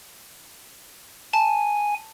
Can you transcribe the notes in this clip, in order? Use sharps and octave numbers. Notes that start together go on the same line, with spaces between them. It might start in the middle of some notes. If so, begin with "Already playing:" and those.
G#5 A5